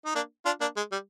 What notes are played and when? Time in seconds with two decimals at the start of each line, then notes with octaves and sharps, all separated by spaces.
0.05 D#4
0.15 A#3 D4
0.45 D4 F4
0.61 A#3 D4
0.77 G#3
0.92 G3